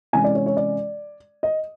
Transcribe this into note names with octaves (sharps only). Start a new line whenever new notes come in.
C3 E3 G#3 C#4 G#5
D5
C#5
C#5
D5
D#5